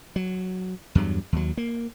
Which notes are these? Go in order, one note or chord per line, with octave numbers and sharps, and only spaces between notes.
F#3
E2 G2 F#3
D#2 F#3
A#3